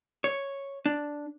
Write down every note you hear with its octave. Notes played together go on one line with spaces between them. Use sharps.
C#5
D4